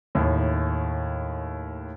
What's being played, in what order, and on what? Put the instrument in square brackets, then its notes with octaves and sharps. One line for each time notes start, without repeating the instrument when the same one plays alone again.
[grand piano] D#2 A2